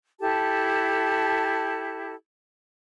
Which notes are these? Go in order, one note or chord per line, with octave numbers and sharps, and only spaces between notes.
E4 G4 A4 A5